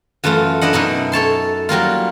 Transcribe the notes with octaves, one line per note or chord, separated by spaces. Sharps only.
F#2 E3 A3 E4 F4
D4 E4 D#5 F#5
F#2 B2 D#4 E4
A4 C#5 A5 C6
F#3 G3 A#3 F4